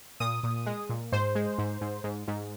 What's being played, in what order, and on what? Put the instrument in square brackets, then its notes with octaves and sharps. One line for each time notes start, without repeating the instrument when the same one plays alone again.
[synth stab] A#2 D#6
A#2
G#3
A#2
G#2 C5
G#3
G#2
G#2
G#2
G#2